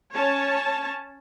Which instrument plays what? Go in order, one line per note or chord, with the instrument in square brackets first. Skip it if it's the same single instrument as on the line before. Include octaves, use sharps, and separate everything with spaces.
[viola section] C#4 C#5 A5